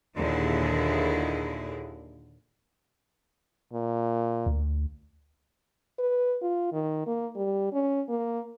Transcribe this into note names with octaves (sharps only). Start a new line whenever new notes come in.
D#2 A#2 D3 E4 G#4
A#2
D2
B4
F4
D#3
A#3
G3
C#4
A#3